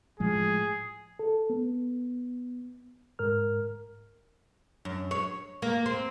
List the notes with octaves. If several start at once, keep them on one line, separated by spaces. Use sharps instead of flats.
A2 F3 G#3 G#4
A4
B3
G#2 A#4 F6
F#2
C#5
A#3
C4